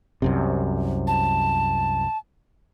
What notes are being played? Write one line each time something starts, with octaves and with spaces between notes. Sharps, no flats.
C2 F#2 C3
A5